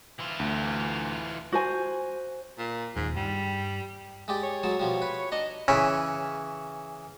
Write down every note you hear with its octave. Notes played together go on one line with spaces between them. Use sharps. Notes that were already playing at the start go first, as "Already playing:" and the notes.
E3 F4
D2
F#4 C5 G#5
A#2
D#1 D#2 G#2
G2 G3
G#3 G4 D5
C#5
F#3 G#3 A5
B2 F3 G3
B4
D4 D#5 A#5
C#3 E3 C#4 B5